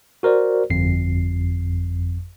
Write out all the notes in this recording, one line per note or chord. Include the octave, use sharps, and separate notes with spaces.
F#4 A#4 C5 D5
G1 F2 C7